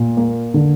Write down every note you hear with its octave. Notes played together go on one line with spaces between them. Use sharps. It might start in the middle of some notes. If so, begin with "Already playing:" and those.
Already playing: A#2
A#3
D3